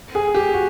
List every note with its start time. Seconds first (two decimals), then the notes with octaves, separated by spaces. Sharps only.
0.15 G#4
0.35 G4
0.53 F#4